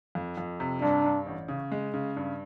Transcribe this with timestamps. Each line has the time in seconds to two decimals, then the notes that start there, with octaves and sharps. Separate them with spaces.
0.15 F2
0.38 F2
0.60 C3
0.82 G2 D4
1.05 G2
1.26 A1
1.48 C#3
1.72 G#3
1.94 C#3
2.16 G2